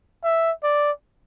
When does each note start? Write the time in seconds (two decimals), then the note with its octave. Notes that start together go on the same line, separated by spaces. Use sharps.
0.24 E5
0.63 D5